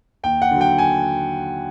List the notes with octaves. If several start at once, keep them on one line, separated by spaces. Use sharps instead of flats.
D#2 G5
F#5
D3 F#3
G5
G#5